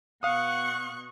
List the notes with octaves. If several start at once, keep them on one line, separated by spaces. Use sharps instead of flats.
B2 F5 F#5 C#6 D#6 F#6